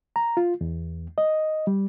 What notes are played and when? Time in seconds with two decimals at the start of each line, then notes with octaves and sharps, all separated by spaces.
0.16 A#5
0.37 F4
0.61 E2
1.18 D#5
1.67 G3